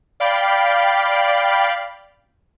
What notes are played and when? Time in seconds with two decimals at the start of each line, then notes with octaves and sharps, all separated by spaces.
0.20 D5 F5 G5 B5